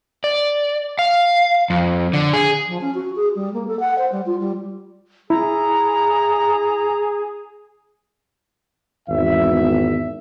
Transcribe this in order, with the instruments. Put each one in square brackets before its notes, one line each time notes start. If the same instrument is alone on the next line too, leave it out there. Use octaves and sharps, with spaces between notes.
[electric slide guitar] D5
F5
F2
D3
G#4
[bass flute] F3
C#4
F#4
G#4
G3
A#3
A4
F#5
C5
G3
F4
G3
[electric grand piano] E4 [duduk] G#4 [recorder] A#5
[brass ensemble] G#1 E2 E5